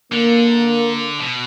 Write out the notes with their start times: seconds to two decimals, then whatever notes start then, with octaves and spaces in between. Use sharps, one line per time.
0.12 D3 A#3
1.20 B2